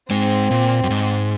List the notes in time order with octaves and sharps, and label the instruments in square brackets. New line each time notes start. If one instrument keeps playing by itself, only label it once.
[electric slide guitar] G#2 G#3 [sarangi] C4
[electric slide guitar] A#2
F#2
G#2